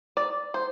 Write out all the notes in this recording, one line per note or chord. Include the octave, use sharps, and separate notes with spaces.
D5
C5